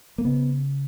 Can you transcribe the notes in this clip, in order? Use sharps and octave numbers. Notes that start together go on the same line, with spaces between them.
A#3
C#3 B3